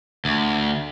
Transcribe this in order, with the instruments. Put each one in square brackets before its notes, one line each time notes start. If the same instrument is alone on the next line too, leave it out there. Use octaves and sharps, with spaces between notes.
[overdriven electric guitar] D2